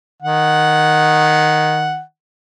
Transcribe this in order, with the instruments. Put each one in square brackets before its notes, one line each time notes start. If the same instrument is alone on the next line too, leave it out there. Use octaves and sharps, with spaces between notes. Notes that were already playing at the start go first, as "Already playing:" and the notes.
[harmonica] D#3 F#5